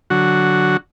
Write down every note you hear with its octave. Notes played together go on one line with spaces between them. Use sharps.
D3 F#3 F#4